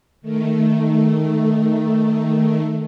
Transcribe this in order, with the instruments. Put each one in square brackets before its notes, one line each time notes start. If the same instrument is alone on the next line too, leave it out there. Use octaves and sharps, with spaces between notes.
[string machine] D#3 A3